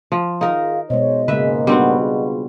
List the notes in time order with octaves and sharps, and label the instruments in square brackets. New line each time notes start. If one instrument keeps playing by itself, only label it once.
[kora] F3
[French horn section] D#3 F4 G#4 [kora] D#4 A#4 [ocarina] F5
[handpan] B2 G#3 [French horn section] C5 C#5 [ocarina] D#5
[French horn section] G#2 A#3 [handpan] C#3 G#3 [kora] B4 E5
[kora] G3 C4 F#5 [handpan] B3 D4 F#4
[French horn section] F4 G#4